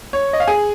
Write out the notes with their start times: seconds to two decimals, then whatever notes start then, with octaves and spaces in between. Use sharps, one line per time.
0.13 C#5
0.33 D#5
0.40 F5
0.47 G#4 G#5